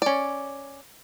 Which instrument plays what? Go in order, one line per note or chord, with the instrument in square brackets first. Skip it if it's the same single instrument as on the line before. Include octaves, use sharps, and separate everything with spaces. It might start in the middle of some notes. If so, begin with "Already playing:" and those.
[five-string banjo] C#4 D5